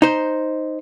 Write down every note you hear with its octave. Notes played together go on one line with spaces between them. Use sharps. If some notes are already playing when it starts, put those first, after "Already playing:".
D#4 C5